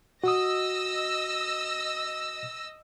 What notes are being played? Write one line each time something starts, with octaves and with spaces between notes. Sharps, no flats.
F#4 D#5 D#6 E6 A#6